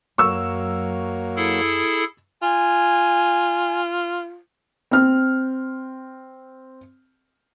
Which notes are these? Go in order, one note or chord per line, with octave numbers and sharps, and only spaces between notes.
F#2 F#3 A#3 C#6 E6
E4 G#4 A4
F4 G#5
C4 F6